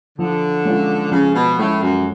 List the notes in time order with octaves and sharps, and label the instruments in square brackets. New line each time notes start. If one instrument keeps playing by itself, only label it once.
[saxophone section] D3 [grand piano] F3
[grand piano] G#3 C#4 F4 A4
[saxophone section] C#3 [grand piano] F3
[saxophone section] B2
[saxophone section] A2 [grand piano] G#3 C#4 F4 A4
[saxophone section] F#2